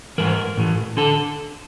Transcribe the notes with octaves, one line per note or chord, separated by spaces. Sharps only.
G#2 E3 A#4
A2 E3
D3 A4